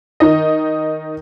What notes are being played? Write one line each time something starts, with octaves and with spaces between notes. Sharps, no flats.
D#3 D#4 D#5